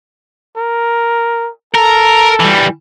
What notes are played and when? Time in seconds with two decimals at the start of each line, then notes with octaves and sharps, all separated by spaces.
0.57 A#4
1.74 A4 A#4
2.40 E3 G3